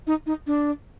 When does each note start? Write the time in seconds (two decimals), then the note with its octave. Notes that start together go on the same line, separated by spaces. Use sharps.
0.07 D#4
0.26 D#4
0.47 D4